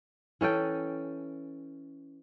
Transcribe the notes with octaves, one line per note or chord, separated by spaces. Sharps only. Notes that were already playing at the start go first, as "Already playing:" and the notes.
E3 C#4 A4 G5